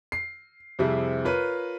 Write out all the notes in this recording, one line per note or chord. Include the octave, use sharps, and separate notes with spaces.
C7
F2 C3 G3 E4 G#4
F4 A#4 B4 C#5